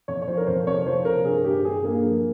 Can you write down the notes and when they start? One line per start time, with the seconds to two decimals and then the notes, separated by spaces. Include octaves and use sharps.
0.08 F2 C#5
0.22 C#5
0.27 F3 C5
0.37 A#4
0.47 F2 C5
0.67 C3 C#5
0.86 F3 C5
1.05 C3 A#4
1.25 G2 G#4
1.44 G2 G4
1.65 G2 G#4
1.83 G2 A#3
2.03 F3